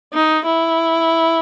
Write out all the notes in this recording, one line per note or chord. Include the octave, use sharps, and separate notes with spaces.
D#4
E4